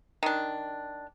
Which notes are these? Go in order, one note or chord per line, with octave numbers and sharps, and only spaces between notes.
D#3 D4